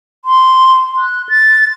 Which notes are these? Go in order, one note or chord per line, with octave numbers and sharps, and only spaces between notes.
C6
F#6
A6